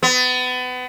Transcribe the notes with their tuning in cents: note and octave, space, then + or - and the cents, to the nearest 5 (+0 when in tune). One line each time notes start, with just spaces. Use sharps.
B3 +30